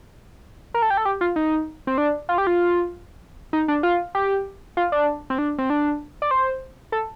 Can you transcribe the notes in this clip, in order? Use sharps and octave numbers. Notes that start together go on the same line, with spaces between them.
A#4
A4
G4
A4
G4
F4
D#4
C4
D4
F4
G4
F4
D#4
D4
F4
G4
F4
D4
C4
D4
C4
D4
D5
C5
A4